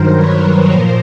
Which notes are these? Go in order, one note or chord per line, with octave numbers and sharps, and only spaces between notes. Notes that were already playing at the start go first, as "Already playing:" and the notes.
Already playing: G2 D#3 F#3 A#4 C5
B4 C#5
A#2 F3 A#4 C5